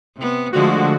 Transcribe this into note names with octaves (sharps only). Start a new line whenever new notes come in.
C3 B3
D3 F3 G#3 A3 F#4